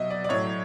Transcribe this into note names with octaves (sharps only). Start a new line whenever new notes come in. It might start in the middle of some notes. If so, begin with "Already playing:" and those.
Already playing: B2 F#3 D#5 E5
D5
D5
A2 F#3 C#5